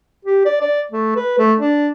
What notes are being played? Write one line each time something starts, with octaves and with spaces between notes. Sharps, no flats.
G4
D5
D5
A3
B4
A3
D4